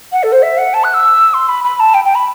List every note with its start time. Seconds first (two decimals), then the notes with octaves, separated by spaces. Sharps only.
0.12 F#5
0.23 A4
0.32 C5
0.42 E5
0.58 F#5
0.74 A5
0.84 F#6
0.94 E6
1.34 C6
1.49 B5
1.64 B5
1.80 A5
1.94 G5
2.05 G5
2.15 B5